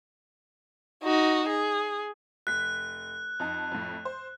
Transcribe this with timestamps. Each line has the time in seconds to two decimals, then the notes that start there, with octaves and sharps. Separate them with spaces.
1.03 D#4 F#4
1.49 G#4
2.47 F1 F#6 B6
3.40 F2 D#4 A5
3.71 F2 A2
4.05 C5